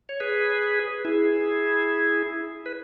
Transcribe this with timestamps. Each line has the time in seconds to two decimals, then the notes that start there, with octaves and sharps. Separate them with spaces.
0.09 C#5
0.20 G#4 B4
1.05 E4 G#4
2.66 B4